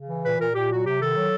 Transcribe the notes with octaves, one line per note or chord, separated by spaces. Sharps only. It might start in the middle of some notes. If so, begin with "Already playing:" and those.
Already playing: C#3
E3
A#2 B4
A#2 A#4
A#2 G4
F#3 F#4
C3 G4
D#3 A4
F#3